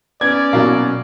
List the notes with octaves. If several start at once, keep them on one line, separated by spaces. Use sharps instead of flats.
B3 C#4 D5 G#6
B2 F#3 A#3